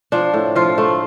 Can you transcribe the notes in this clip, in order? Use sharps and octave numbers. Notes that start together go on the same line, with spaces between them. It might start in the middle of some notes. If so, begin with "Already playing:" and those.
F3 D4
A2
F3 F4
A3